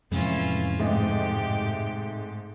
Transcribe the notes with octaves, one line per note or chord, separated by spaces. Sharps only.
F2 A2 C3 E3 G#3 C#4 F4
G#2 A3 G4 D#5